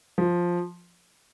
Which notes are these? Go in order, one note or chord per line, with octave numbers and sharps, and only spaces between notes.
F3